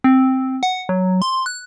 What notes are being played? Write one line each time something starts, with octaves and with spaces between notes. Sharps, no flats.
C4
F#5
F#3
C6
F#6